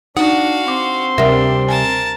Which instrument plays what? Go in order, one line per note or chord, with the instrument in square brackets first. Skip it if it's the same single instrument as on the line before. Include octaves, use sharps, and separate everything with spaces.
[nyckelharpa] D4 [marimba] D#4 [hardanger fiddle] F#4 F5 [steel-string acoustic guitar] F#5
[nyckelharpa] C4 C6 [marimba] D6
[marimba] D2 A#4 E5 [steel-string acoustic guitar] C3 G3 [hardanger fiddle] D4
[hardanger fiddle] A#4 A5 [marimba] G#5